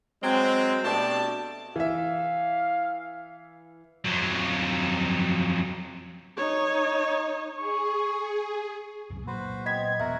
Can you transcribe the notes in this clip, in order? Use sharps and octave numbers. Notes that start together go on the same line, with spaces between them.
F#3 G#3 C4
B2 A3 D4 G4 A5
E3 E5 F5
F2 F#3
D#4 C#5
G#4 C#6
C2 F#2 A2
A#2 F#3 A#3 F#4 B4 C5
B3 C4 D#5 G#6 B6
E1 B3 F#4 A#4 E5 F#5